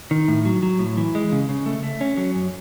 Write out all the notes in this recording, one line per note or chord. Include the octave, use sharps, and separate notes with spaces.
D#3
A2
F#3
F#3
A2
E3
G#3
C#3
C#3
A3
A3
C#4
F#3
F#2